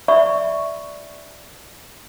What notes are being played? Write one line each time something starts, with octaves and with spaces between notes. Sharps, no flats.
D5 E5 B5 C#6